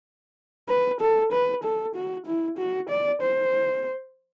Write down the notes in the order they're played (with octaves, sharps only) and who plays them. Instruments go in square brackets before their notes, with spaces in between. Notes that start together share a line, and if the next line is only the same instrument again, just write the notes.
[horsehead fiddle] B4
A4
B4
A4
F#4
E4
F#4
D5
C5